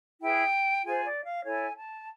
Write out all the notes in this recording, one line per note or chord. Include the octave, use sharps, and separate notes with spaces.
E4 G#4 B4 G5
F4 G#4 C5 G#5
D5
F5
E4 A4 C#5 G#5
A5